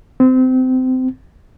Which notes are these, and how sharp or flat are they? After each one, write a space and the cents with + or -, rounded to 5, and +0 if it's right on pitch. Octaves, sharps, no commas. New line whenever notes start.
C4 -25